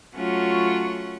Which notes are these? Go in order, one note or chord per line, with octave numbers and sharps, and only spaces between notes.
F#3 A3 C#4 F4 F#5 C#6